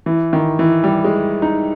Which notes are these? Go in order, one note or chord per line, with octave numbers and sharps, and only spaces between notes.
E3
D#3
E3
G3
G#3
D#4